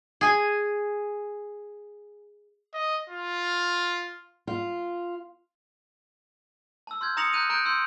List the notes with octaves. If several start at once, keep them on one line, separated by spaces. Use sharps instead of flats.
G#4 G#5
D#5
F4
F4
A5 E6
C6 F6 G6 G#6
A#5 D#6 A#6 C#7 F7 F#7
A#5 F#6 G6 D#7 F7
A#5 F#6 G6 D7
C6 E6 G6